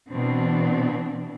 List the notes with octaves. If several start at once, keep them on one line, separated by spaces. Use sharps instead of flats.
B2 E3 C4 D4